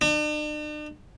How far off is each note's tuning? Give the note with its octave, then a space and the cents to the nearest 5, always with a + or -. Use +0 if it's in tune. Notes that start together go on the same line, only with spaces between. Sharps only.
D4 +45